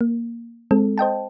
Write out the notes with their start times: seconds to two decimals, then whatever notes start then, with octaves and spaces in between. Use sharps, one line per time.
0.01 A#3
0.71 G#3 C4 A4
0.98 C5 D#5 G5 A5